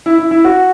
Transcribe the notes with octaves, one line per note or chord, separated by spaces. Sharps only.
E4
E4
E4
F#4